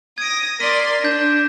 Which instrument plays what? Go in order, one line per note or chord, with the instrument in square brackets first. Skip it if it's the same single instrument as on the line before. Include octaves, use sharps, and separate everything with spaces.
[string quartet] D#6 A#6 [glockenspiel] G#6 D7
[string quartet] A#4 D5 C6 [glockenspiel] A#6 B6 D#7
[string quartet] D4 [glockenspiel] G6 A#6